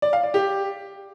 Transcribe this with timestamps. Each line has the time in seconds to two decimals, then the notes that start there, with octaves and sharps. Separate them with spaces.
0.02 D5
0.13 F5
0.23 D5
0.34 G4